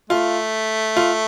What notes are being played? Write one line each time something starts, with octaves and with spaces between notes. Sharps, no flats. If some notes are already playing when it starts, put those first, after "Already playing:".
A3 F4
F4